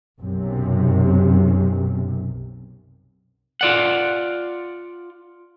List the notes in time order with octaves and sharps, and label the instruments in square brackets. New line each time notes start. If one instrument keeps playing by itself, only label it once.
[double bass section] B1 F#2 C3
[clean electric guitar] F4 D5 F#5